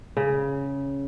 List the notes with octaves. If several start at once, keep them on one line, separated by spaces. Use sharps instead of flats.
C#3